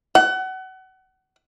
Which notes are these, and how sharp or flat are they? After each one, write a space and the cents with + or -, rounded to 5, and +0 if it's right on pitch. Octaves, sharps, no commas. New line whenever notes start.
F#5 +30